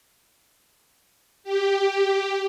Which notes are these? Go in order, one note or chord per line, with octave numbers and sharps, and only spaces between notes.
G4